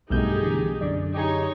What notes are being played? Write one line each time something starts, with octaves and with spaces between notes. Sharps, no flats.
B1 G2 B2 A3 D#4 G4 G#4 G6
D3 E3
F#2 D3 D5
D#4 G4 G#4 C#5